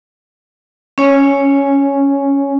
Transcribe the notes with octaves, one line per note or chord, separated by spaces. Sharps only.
C#4 C#5 G#5